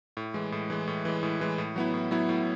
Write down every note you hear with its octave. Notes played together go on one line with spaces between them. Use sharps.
A2
E3 G#3
A2
E3 G#3
A2
E3 G#3
A2
E3 G#3
A2
F#3 B3 E4
A2
F#3 B3 E4
A2